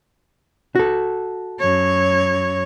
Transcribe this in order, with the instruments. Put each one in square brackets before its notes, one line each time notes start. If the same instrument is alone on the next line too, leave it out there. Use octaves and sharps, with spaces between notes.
[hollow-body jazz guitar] F#4 A4
[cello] F#2 C#5